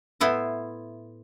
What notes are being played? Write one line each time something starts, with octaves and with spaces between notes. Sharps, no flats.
A2 B3 E4 C5